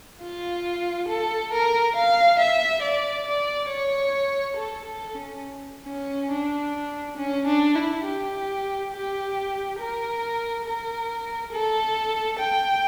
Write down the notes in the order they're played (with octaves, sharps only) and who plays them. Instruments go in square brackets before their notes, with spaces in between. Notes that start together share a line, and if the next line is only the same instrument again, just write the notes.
[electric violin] F4
A4
A#4
F5
E5
D5
D5
C#5
A4
A4
C#4
C#4
D4
C#4
D4
E4
G4
G4
A#4
A#4
A4
G5